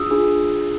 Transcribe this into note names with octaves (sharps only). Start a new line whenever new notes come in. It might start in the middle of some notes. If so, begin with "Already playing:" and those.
Already playing: D4 F4 G#4 D#6 E6
D4 F4 G#4